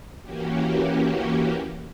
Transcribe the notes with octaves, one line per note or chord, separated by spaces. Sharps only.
E3 A#3 C#4 F#4 G4